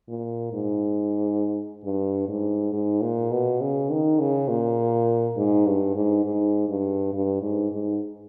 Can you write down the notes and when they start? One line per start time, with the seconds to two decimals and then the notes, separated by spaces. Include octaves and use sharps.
0.08 A#2
0.53 G#2
1.84 G2
2.28 G#2
2.73 G#2
3.02 A#2
3.31 B2
3.61 C#3
3.90 D#3
4.19 C#3
4.48 A#2
5.37 G#2
5.66 G2
5.95 G#2
6.25 G#2
6.69 G2
7.13 G2
7.42 G#2
7.72 G#2